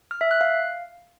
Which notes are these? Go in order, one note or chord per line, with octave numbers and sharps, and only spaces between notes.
F6
E5
F#6
F5